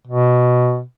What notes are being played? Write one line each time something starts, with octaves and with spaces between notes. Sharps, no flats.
B2